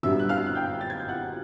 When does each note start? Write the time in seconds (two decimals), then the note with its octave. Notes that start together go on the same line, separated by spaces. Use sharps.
0.03 G1 F#2 D3 G3 E5 E6
0.19 F#6
0.29 F5 F6
0.46 F#6
0.55 G5 G6
0.81 A6
0.90 G#6
1.00 G6
1.09 F#5 F#6